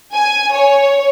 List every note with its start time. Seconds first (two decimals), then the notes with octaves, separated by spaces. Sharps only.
0.14 G#5
0.53 C#5